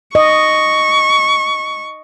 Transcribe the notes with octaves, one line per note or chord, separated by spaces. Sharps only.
D#5 C#6